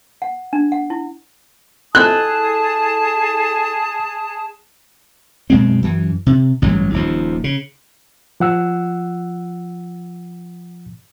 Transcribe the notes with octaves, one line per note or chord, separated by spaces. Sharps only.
F#5
D4
F#5
E4
E4 G#4 A4 A5 D#6 F#6
F#2 B2 G#3 C4
F#2 E3
C3
A1 G2 E3 F#3
D#1 D#2 F3
C#3
F3 F#5 E6